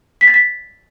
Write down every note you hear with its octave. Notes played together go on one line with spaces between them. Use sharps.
B6
A6
B6